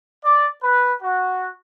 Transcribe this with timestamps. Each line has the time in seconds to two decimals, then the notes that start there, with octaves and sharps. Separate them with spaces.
0.25 D5
0.63 B4
1.03 F#4